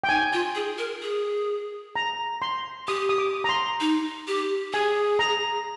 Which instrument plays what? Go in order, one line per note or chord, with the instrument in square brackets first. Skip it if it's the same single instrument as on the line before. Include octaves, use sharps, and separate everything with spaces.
[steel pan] G5
[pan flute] D#4 [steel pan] G#5
[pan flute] F4
G#4
A#4
G#4
[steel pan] A#5
C6
[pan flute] G4 [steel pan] D#6
[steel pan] D#6
D6
A#5
C6
[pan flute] D#4
G4
[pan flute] G#4 [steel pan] G#5
[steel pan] A#5